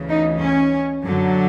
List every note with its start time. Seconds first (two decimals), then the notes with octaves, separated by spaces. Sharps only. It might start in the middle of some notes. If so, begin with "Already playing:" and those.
Already playing: D2 C#3 E3
0.09 D#4
0.41 C#4
1.04 F#2 D3 F#3